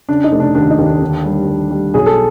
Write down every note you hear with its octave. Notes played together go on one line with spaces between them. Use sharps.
C#3 D4
D#4
F1
D4
D#2 D4
D#4
D#2
D4
D3
G3
D#2
G3
B1 G#4
A4